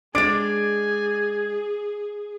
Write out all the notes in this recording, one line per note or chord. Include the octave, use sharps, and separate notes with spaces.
G#3 D4 G#4 G#5 D6 A6 D7